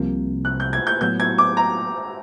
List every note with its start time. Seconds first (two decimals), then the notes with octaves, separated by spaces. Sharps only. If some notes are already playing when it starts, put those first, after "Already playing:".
Already playing: C2 C3 F3 A#3
0.45 F#6
0.60 G6
0.73 G#6
0.87 G6
1.01 A2 F#3 B3 G6
1.20 G#6
1.38 D6
1.57 A#5